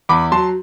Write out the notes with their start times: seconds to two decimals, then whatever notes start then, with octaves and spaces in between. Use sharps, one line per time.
0.09 E2 B5 D6
0.32 F#3 A5 C6